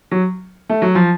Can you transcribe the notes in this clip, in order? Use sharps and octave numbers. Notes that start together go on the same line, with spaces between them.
F#3
A3
F#3
F3